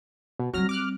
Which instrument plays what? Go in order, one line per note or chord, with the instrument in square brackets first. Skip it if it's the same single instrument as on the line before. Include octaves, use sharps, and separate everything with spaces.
[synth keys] B2
[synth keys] F#3 F6 A#6 [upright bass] G3 C4
[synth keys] D6 F6 F#6